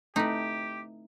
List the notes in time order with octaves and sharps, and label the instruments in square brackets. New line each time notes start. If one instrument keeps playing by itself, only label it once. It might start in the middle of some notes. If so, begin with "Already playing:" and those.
[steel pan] A3 C4 [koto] D#4 B4 [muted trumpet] G4